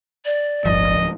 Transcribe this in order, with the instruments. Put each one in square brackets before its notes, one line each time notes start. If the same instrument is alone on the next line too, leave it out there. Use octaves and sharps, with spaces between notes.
[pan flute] D5
[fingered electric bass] D1 F3 [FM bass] G1 [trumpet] D#5